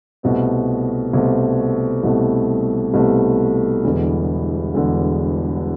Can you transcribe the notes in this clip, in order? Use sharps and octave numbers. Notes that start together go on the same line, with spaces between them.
C2 B2 A3 C4
C2 B2 A3 C4
C2 B2 A3 C4
C2 B2 A3 C4
E1 E2 D3
E1 E2 D3